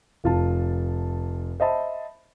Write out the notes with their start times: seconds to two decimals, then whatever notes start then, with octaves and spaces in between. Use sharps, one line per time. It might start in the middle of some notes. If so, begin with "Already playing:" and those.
0.24 F1 F4 A5
1.60 C5 D#5 E5 A5 B5